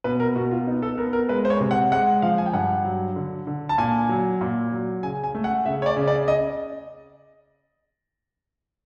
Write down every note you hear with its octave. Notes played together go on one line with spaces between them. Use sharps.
B2 B4
A#4
B2 F#4
F4
B3 D#4
A4
B3 A#4
A#4
G#3 B4
C5
C#5
C3
F#5
G#3 F#5
F3 F5
G#5
G5
G2 F#5
F#3
D3
D3
A5
A#2 G#5
F#3
A#2
F#3
C#3 G#5
G#5
A3
F#5
C#3 E5
C#5
D5
C#3
D5
D#5